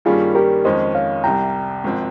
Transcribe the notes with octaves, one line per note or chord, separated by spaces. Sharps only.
G2 D#3 G3 A#3 C#4 F4 G#4
G4 A#4
F2 D#3 G#3 C#4 C5 D#5
C#5 F5
C2 C3 G3 G5 A#5
G#1 G#2 F3 C4